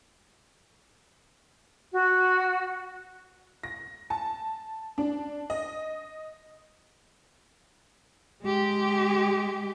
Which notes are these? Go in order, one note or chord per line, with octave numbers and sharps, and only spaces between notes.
F#4
A#6
A5
D4
D#5
G#3 G4